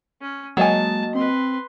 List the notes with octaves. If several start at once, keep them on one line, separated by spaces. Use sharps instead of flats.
C#4
F#3 G#3 A#3 D#5 G#5 A5
C4 B4 C6